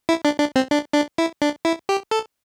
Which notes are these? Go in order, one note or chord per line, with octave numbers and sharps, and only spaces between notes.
E4
D4
D4
C4
D4
D4
E4
D4
E4
G4
A4